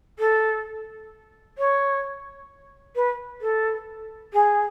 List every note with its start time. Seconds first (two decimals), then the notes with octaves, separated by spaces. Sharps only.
0.19 A4
1.58 C#5
2.96 B4
3.41 A4
4.33 G#4